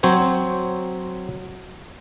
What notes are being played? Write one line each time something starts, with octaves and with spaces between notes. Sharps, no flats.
F#3 C4 C5 C#5